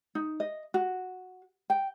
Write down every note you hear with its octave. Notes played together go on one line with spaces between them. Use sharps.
D#4
D#5
F#4
G5